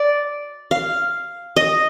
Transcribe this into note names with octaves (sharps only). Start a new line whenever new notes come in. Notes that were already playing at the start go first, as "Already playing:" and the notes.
Already playing: D5
F5
D#5